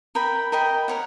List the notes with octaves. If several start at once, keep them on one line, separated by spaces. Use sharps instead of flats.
A#4 D#5 G5 B5
A#4 D#5 G5 B5
A#4 C#5 F#5